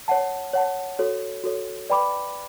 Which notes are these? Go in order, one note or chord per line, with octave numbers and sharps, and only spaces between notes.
C#5 F#5 A5
C#5 F#5 A5
F#4 A4 C#5
F#4 A4 C#5
B4 D5 G5 B5 D6